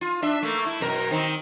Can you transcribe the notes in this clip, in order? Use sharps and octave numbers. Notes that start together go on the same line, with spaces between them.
F4
D4 E5
A3 A#3
E4
F#2 B2 A#4
D#3 C4 D#4